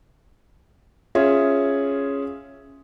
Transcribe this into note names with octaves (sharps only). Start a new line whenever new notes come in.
C#4 F4 G#4 E5